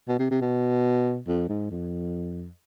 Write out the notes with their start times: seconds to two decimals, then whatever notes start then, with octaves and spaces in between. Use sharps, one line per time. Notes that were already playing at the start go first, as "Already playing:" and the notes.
0.08 B2
0.19 C3
0.31 C3
0.41 B2
1.28 F2
1.49 G#2
1.71 F2